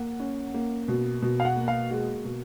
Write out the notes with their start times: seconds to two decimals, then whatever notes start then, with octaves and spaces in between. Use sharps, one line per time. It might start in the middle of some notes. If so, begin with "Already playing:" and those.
Already playing: A#3 F#5
0.20 C#4
0.54 A#3
0.88 B2
1.22 B2
1.40 F5
1.45 F#5
1.56 A#3
1.68 F5
1.90 G#3 F#4
2.25 B2